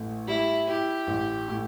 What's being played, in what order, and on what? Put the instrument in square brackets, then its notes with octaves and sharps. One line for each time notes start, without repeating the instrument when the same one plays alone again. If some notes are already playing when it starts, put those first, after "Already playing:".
Already playing: [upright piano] A1 A2
[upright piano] G3 [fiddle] E4
[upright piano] E4 [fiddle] G4
[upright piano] A1
A2